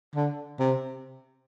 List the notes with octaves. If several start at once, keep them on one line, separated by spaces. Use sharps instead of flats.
D3
C3